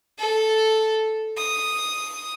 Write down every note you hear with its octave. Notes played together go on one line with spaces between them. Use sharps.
A4
D#6